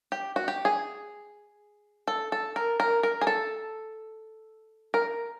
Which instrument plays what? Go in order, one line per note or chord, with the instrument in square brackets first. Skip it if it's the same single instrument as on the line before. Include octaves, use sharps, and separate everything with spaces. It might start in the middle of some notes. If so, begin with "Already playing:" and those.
[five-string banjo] G4
F#4
G4
G#4
A4
A4
A#4
A#4
A#4
G#4
A4
A#4